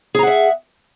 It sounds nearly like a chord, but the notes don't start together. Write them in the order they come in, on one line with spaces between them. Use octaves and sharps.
G#4 A#5 F#5 E5